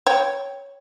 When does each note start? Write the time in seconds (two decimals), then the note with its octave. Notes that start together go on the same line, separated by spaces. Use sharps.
0.07 C#5 G5